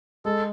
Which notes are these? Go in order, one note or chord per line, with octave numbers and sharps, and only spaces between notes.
G#3 A4